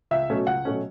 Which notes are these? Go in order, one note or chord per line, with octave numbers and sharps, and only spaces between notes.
C#2 E5
B2 F#3 A3 C#4
C#2 F#5
B2 F#3 A3 C#4